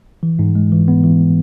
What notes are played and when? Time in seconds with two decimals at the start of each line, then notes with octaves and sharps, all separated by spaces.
0.23 E3
0.39 G#2
0.55 G#3
0.72 E3
0.88 B3
1.04 E3